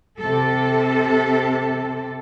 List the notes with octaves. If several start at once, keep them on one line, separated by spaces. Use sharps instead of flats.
C3 A4